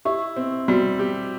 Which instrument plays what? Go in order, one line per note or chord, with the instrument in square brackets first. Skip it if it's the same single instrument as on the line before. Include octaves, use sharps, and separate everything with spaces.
[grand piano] E4 [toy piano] G4
[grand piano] C4
[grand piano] G3 [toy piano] F#4
[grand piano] G4